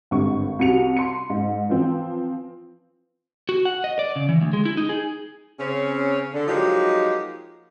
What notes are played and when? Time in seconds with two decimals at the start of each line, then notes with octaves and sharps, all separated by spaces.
0.11 G#1 G2 D3 C#6
0.59 C2 C3 F#4 C#7 F7
0.97 C6 C#7
1.30 G#2
1.69 E3 F3 C4
3.49 F#4
3.65 F#5
3.84 D#5
3.99 D5
4.16 C#3
4.29 E3
4.41 D2
4.53 G#3
4.65 E4
4.77 D#4
4.89 G#4
5.59 C#3 C4 C#4
6.33 D3
6.47 F3 F#3 G#3 A#3 D#4 G4